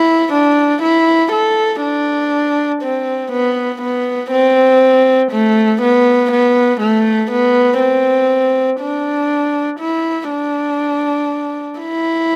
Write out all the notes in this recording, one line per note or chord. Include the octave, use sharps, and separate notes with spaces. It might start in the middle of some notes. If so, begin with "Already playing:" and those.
Already playing: E4
D4
E4
A4
D4
C4
B3
B3
C4
A3
B3
B3
A3
B3
C4
D4
E4
D4
E4